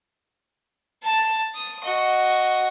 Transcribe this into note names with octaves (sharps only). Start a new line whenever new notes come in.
A5
D#6
F#4 D#5